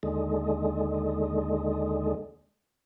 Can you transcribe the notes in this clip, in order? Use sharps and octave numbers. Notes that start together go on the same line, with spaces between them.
D#2 D3 G#3